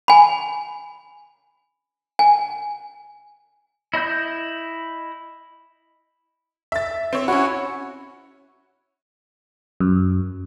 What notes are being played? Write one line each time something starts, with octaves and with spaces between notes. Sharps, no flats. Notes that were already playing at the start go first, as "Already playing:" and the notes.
G#5 B5
G#5
E4 D#5 B5 G6
E5 A6
C4 C#5
C#4 E4 F#4 C#5
F#2